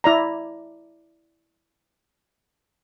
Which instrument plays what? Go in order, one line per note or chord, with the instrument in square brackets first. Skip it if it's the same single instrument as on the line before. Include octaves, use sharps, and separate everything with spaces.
[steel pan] E4 D5 A#5